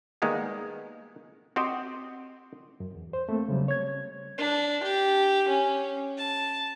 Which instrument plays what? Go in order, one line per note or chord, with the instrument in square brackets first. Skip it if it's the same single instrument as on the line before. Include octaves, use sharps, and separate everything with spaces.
[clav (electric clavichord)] D#3 G3 G#3 A#3 B3
C4 F#4 G4 C5 D#5
[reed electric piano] F#2
E2
C5
A3 A#3 C4
C#3 F#3 G3
C#5 G#6
[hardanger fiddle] D4
G4
C#4
A5